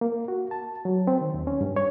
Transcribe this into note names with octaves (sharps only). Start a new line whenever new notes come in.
A#3
F#4
A5
F#3
C4
D#3
D#2
C#4
G2
C#5